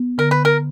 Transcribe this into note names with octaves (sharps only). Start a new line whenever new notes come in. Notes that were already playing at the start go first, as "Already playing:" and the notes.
Already playing: B3
D3 A#4
B4
A#4